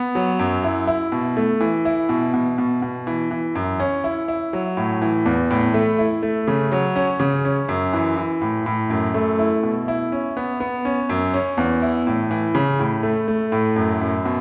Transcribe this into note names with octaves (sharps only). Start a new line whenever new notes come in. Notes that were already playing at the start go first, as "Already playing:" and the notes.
Already playing: B3
F#3
F#2
E4
E4
B2
A3
E3
E4
B2
B2
B2
B2
E3
E3
F#2
C#4
E4
E4
F#3
A2
E3
E2
A2
A3
E4
A3
C#3
F#3
C#4
C#3
C#4
F#2
E3
E3
A2
A2
F#2
A3
E4
B2
E4
C#4
B3
B3
C#4
F#2
C#4
E2
E4
A2
E3
C#3
A2
A3
A3
A2
F#2
F#2
B2